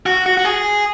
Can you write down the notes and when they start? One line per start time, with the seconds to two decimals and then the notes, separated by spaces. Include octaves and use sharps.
0.06 F#4
0.26 F#4
0.37 F#4
0.45 G#4